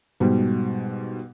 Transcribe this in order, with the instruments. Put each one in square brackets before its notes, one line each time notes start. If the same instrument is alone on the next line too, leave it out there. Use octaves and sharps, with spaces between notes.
[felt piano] G#2 B2 G3